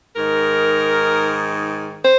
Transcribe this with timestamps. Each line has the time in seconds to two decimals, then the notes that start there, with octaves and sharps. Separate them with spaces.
0.16 G#2 D#3 A#4
2.04 C5